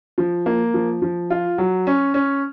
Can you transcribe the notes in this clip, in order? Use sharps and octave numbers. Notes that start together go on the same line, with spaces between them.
F3
A#3
F3
F3
F4
F#3
C#4
C#4